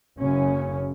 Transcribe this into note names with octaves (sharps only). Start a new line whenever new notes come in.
F#1 F#2 C#3 C#4